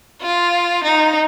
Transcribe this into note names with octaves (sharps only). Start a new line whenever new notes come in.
F4
D#4